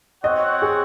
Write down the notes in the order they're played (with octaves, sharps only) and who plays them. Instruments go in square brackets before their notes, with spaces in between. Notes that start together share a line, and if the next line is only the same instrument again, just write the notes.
[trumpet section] C4 F#4 C#5 F#5 [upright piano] D#5
[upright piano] G#4